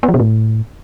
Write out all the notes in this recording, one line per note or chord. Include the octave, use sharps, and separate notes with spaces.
B3
F3
B2
A2